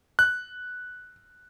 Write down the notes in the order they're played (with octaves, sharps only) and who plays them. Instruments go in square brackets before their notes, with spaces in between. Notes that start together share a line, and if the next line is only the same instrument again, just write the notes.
[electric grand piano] F#6